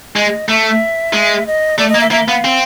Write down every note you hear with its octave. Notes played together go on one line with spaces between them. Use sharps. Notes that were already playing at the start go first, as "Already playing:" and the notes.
G#3 D#5
A3 E5
G#3
D#5
A3 D5
D#5
A#3
E5
A#3 E5
B3 F5
C4